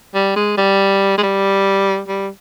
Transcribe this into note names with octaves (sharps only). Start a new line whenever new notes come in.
G3
G#3
G3
G#3
G3
G3